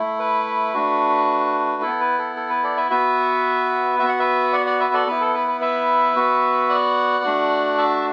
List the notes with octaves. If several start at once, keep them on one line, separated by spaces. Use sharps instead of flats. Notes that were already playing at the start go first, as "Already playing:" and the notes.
Already playing: A3 E4
B4
A3 D4 F#4
B3 E4 A4
B4
A4
A4
B4
A4 D5
B4 E5
B3 F#4 B4 E5
B3 F#4 E5
F#5
B4 E5
D5 F#5
D5 F#5
B4 E5
A4 D5
B3 E4 B4
A4
B4
B4
B4 E5
B3 F#4
D5 F#5
A3 D4 F#4
E5 A5